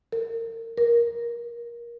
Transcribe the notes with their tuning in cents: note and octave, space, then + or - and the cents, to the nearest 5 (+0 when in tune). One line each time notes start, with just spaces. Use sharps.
A#4 -35
A#4 +20